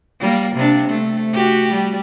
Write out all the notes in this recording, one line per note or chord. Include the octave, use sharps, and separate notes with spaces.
G3 A#3
C3 D4
A3
F#4 G4
G3